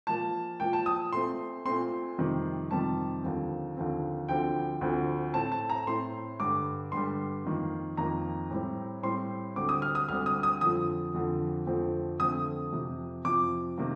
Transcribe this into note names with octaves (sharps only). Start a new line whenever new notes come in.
A#2 F3 A#3 A5
A#2 F3 A#3 G5
A5
D#6
A#2 A3 C4 C6
A#2 A3 C4 C6
F2 C3 D#3 G3 C4
F2 C3 D#3 G3 C4 A5
D#2 D3 F3 C4
D#2 D3 F3 C4
D2 D3 F3 C4 G5
D2 D3 F3 C4
A2 A3 C4 A5
A5
A#5
A2 A3 C4 C6
G2 D3 G3 D6
G2 D3 G3 C6
F2 D#3 A#3
F2 D#3 A#3 A#5
A2 G3 C4
A2 G3 C4 C6
D2 D3 G3 C4 D6
D#6
F6
D#6
D2 D3 G3 C4 F6
D#6
D#6
F2 D3 F3 D#6
F2 D3 F3
F2 D3 F3 A3 C4
F2 D3 F3 A3 C4 D#6
F2 C3 F3
F2 C3 F3 D6
C3 D#3 A#3